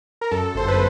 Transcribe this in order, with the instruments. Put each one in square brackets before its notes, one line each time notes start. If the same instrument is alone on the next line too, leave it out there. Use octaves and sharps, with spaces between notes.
[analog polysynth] A#4
F#2 A4
G1 C5
B4